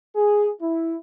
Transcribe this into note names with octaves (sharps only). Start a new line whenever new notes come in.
G#4
E4